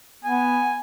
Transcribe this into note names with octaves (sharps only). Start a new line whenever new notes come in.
B3 G#5